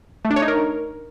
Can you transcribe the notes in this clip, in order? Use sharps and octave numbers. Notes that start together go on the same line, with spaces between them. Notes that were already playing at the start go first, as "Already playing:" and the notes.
A3
D4
C#5
D#4
A#4